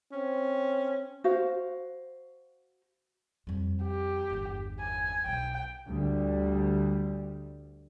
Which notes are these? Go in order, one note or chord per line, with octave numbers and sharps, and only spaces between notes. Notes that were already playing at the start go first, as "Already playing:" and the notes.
C4 C#4
F#4 C5 F5
F2 G3
G4
G1 E2
G#5
B1 G5
D2 G3